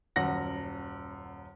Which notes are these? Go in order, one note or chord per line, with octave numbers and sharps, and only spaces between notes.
D#1 F#2 F#5 A#6